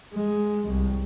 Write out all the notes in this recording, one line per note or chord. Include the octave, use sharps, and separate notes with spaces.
G#3
C2